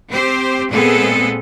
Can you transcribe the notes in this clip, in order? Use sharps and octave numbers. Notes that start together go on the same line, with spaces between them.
C4 G4 C5
A#2 G#3 B3 C4 G#4 A4